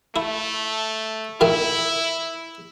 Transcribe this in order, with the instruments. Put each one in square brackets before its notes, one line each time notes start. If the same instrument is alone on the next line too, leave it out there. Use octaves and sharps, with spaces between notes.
[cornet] A3 [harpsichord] E4
[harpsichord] A#2 D#3 A3 [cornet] E4